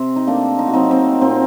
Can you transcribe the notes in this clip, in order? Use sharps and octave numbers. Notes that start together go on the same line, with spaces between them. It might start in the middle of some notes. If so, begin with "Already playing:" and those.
Already playing: C3 C4
D#4
A3 A#3 D4
D#4
F#4
F#3 C4 D#4
C4
A#2 C4 D#4